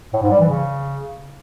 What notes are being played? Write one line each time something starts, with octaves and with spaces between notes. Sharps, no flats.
A2
G#2
G3
E3
C#3